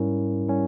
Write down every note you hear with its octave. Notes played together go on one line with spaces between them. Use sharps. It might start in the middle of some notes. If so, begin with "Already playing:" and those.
Already playing: G#2 G3 C#4 E4 A#4
G3 C#4 E4 A#4